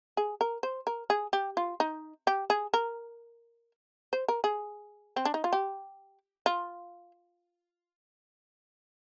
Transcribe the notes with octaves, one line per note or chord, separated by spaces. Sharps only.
G#4
A#4
C5
A#4
G#4
G4
F4
D#4
G4
G#4
A#4
C5
A#4
G#4
C4
D4
D#4
F4
G4
F4